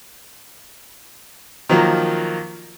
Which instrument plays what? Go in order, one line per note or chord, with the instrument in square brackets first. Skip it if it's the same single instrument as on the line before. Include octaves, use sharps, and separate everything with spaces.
[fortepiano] D#3 F3 F#3 A#3